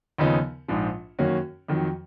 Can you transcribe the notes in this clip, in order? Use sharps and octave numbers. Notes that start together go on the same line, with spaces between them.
D#2 C#3 F3 B3 D#4
A#1 G#2 F3
F#2 D#3 A#3 C#4 F#4
F2 D#3 F#3